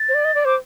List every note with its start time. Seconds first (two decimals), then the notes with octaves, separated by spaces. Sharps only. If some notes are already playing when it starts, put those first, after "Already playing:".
Already playing: A6
0.09 C5
0.14 D5
0.25 D#5
0.35 D5
0.45 C5 D6